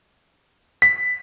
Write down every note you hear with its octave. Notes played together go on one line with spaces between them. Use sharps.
B6